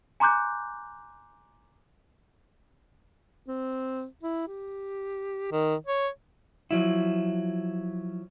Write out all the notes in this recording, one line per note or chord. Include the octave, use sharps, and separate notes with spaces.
G#5 A#5 C6 D6 F#6 G6
C4
E4
G4
D#3
C#5
F3 F#3 E4